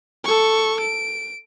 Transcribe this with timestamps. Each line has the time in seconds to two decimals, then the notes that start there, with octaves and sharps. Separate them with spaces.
0.25 A4 C#6
0.80 D7